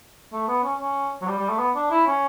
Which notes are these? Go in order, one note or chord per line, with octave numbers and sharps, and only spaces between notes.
A3
B3
C#4
C#4
F#3
G3
G3
A3
B3
D4
E4
C#4